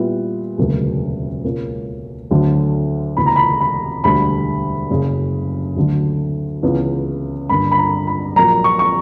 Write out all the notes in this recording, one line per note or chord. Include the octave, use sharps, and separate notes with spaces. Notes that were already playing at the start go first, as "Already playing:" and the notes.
Already playing: A#2 G3 B3 E4
E1 D2 C#3 F#3 A#3
C#2 B2 A#3 C#4
D2 D3 F#3
E1 D2 C#3 E3 B3 B5
A#5
B5
B5
E1 D2 D3 G3 B5
F#1 F#2 C#3
D2 D3 F#3
C#2 C#3 E3 B3
G2 D3 A#3 D4 B5
B5
A#5
B5
A#1 A#2 F#3 A#3 A#5
C#6
C#6